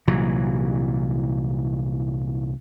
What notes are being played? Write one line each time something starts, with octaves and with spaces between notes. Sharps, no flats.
C2 A#2 E3 F#3